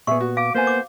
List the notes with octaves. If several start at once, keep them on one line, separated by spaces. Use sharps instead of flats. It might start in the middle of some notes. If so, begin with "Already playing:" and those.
A#2 B3 G#4 E5 C#6
F#4
F5 D6
A#3 B3 C5 G#5
D6